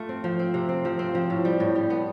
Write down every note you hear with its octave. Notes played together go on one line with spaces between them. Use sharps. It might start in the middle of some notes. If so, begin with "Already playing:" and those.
Already playing: A3 F4
C4
F3
C4
C3
C4
F3
C4
F3
A2
G3
A2
G3
B3